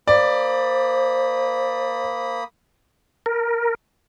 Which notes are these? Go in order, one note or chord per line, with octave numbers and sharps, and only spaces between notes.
A#3 C5 D5 B5 D#6
A#4